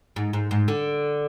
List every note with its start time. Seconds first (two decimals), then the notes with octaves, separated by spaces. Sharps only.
0.16 G#2
0.33 G#2
0.51 G#2
0.68 D3